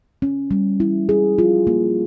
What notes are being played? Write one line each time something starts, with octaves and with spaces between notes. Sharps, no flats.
C#4
G3
E4
G#4
F4
A#3